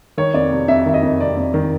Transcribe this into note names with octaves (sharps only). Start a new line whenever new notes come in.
D#3 C#5
F2 D5
C3
F2 E5
D#3 E5
D#5
F2
C3 D5
F2
D#3